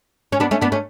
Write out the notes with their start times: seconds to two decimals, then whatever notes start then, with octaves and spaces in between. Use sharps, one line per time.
0.32 C#4
0.40 B3 D4
0.51 A3 C#4
0.61 B3 D4
0.72 A3 C#4